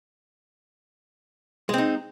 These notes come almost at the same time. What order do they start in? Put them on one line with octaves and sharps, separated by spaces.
G#3 C4 D#4